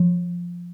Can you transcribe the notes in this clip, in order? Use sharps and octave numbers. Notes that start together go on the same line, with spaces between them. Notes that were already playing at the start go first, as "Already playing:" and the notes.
Already playing: F3